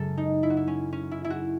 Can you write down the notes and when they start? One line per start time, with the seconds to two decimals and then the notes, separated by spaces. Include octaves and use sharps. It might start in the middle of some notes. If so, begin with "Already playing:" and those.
Already playing: F#2 C#3 G#3 A4
0.18 D#4
0.43 E4
0.50 F#4
0.57 E4
0.67 C#4
0.93 C#4
1.11 E4
1.25 E4
1.30 F#4